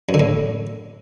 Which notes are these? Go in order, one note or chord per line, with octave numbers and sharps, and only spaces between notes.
F#2
D3
A2